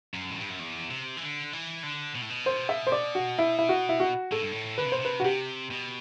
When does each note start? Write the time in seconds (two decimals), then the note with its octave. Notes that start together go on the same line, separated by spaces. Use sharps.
0.14 F#2
0.30 A2
0.40 G2
0.49 F#2
0.60 E2
0.90 C3
1.17 E3
1.22 D3
1.53 E3
1.83 D3
2.15 B2
2.21 A2
2.30 B2
2.46 C5
2.69 E5
2.87 C5
2.92 D5
3.15 F#4
3.39 E4
3.59 E4
3.69 F#4
3.89 E4
4.00 F#4
4.32 A2 A4
4.41 G2
4.52 A2
4.78 D3 B4
4.86 C3
4.92 B2 C5
5.00 C3 B4
5.20 F#4
5.24 C3 G4
5.70 B2